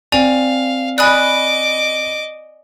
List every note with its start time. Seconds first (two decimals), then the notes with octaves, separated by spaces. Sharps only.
0.12 C4 D5 F5 G5 G#5 F7
0.98 D5 D#5 G#5 B5 D6 D#6 F#6